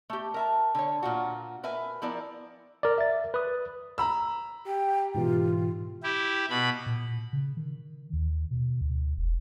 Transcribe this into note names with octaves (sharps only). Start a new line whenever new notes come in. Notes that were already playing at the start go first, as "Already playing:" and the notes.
A3 G4
A#4 E5 A5
D3 C#5
A#2 F4 F#4
A#4 B4 E5 G#5
F3 B3 E4 A#4 D5
A#4 D5
E5 A6
B4 D#6
A#5 B5 E6
G4 G5
G#2 B2 E3 F4
E4 G4
B2 B5
A#2
C#3
D#3
D#2
B2
D2
E1